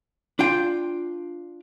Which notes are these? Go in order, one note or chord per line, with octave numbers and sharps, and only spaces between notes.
D4 F4 G5